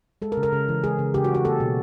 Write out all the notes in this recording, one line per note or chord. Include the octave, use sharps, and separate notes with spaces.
G#3 A4
A#4
C#3
A#4
C#3
E3
G#3 G#4
C#3
C#3 G4
F#4
E3
F#4
A#3 A4
B2